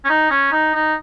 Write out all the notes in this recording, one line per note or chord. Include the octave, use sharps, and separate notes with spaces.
C#4
D#4
C#4
D#4
D#4